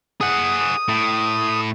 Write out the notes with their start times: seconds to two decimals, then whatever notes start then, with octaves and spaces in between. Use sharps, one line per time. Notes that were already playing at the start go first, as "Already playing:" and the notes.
0.21 G#4 F#5 D#6
0.88 A2